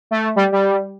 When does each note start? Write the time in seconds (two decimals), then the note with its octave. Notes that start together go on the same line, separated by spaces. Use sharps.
0.11 A3
0.36 G3
0.52 G3